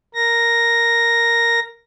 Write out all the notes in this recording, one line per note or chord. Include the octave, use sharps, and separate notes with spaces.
A#4 A#6